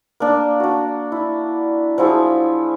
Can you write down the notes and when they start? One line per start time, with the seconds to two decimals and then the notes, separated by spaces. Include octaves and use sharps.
0.20 A#3 D4
0.60 D4 F#4
1.12 E4
1.98 F3 F#3 E4 G#4